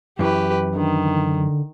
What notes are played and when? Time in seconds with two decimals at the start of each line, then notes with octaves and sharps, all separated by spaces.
0.19 F#2 E3 G4 B4
0.76 D3 D#3